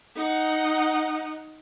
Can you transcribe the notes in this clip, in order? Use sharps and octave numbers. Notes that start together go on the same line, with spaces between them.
D#4 F#5